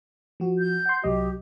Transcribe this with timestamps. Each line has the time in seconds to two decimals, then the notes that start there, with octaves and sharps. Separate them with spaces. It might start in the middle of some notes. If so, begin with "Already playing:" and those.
0.40 F3 F#4
0.59 G6
0.85 F#5 C6
1.04 C2 F#3 G4 D#5